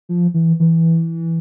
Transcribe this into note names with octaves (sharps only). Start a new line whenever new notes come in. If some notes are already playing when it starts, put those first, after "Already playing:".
F3
E3
E3